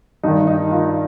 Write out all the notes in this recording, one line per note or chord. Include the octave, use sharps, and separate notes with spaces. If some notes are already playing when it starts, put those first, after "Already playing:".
G2 D#3 D#4
D#4
F4